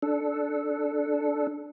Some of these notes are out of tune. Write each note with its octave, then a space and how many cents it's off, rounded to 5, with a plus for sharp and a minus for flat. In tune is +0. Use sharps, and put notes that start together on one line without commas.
D4 +0 A4 -15